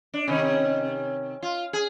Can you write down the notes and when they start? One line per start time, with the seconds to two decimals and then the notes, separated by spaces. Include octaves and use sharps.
0.14 D4
0.28 C3 D#3 C#4
1.42 F4
1.73 G#4